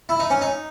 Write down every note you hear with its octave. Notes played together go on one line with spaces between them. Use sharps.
E4
D#4
C#4
D#4